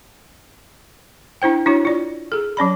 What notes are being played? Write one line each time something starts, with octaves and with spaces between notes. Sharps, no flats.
D4 E4 C5 G5
D4 E4 F#4 C#5
F4 D5
G#4 A4
F#3 C#4 D5 B5